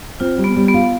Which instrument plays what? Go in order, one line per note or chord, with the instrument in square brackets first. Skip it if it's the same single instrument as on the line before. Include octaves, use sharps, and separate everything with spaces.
[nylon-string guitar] C4 [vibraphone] F4
[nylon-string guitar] G3
[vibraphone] B3
[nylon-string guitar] G3
[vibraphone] B3
[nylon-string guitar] F4